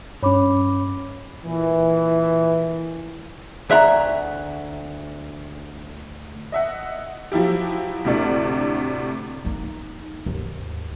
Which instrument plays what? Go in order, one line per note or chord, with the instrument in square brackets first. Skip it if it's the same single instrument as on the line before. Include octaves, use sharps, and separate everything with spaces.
[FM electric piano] G2 C#4 [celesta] C#5 B5 D6
[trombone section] A#2 E3
[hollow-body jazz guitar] D2 E5 F#5 A#5
[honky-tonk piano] D#5 E5 F#5
F3 F#3 E4 G4
D2 A2 C3 A3 D4
[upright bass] A#3 D#4
D#2 G#2